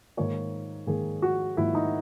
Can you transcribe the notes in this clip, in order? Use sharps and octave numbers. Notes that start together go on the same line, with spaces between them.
G#2 D#3 A#3 C#5
G#2 D#3 A#3 G#4
F#4
G#2 D#3 A#3 E4
D#4